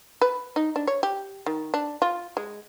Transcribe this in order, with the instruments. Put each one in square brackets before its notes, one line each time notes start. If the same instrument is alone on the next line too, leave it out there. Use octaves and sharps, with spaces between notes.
[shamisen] B4
D#4
D4
C#5
G4
D#3
D4
F4
G#3